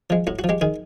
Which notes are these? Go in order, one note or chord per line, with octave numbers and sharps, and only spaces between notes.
F3 G#3
A2 F#4
F#4
F3
G#3 G4
D#3 G#4